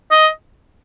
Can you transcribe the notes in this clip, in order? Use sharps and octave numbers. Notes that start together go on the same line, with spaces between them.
D#5